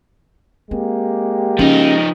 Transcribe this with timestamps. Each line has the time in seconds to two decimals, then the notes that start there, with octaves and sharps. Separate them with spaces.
0.71 G#3 A#3 C4 G4
1.59 F3 C#4 D#4